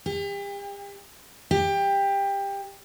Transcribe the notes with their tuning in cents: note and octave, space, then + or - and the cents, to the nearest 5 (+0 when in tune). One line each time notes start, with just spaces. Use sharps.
G4 +40
G4 +20